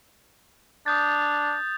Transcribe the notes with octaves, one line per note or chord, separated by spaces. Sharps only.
D4 D#6 G6 A6